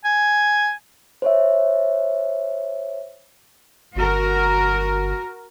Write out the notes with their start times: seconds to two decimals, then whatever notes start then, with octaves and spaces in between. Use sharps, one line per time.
0.05 G#5
1.22 C5 C#5 E5
3.95 G1 F#4 A#4